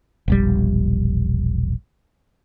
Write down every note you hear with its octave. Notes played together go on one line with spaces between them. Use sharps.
E1 A#1 G3